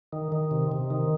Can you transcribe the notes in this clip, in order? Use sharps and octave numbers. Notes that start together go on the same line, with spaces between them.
D#3
D#3
C3
C3
D#3